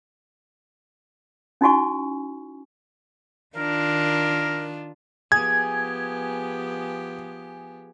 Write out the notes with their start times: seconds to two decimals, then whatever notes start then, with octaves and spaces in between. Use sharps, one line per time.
1.61 C#4 D#4 E4 F#4 G#5 C#6
3.56 D#3 D4 F4 A#4
5.32 F3 B3 G4 G#4 G#6